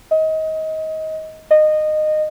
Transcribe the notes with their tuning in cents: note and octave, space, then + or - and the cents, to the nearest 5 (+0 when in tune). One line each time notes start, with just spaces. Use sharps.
D#5 +25
D#5 -20